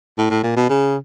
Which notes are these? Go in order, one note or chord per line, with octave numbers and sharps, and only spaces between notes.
A2
A2
A#2
B2
C#3